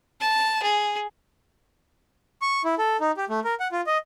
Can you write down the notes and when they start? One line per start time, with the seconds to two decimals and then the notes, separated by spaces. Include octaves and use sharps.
0.21 A5
0.63 G#4
2.42 C#6
2.64 E4
2.78 A4
3.00 D#4
3.17 G4
3.30 A3
3.44 A#4
3.60 F#5
3.72 F4
3.87 D#5